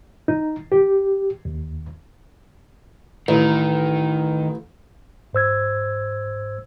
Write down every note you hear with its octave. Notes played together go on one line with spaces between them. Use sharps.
D#4
G4
D#2
A1 D#3
G#2 C5 E6 G#6